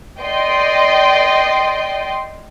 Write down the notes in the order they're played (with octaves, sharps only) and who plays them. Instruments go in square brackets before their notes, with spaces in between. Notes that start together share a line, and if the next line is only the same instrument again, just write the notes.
[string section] D5 D#5 G5 C6